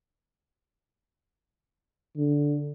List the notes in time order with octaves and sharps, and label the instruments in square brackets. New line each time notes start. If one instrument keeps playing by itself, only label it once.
[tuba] D3